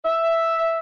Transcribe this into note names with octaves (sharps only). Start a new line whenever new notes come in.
E5